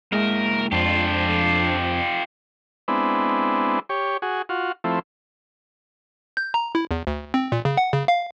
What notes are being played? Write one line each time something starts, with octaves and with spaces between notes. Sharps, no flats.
G#3 A#3 E4 A#4 E5
F2 D4 F4 G4
G#3 B3 C4 D4 E4
G4 C#5
F#4 G#4
F4 F#4
F3 A3 C4 E4
G6
A#5
E4
E2
D2
C4
A#2
C#3
F#5
C#3
F5